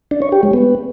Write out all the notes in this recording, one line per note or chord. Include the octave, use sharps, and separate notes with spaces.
D4
C#5
G4
G#3
B3